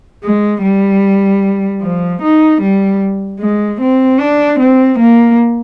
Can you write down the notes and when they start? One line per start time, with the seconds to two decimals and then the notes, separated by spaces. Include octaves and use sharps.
0.23 G#3
0.62 G3
1.82 F3
2.22 D#4
2.62 G3
3.40 G#3
3.81 C4
4.19 D4
4.59 C4
4.99 A#3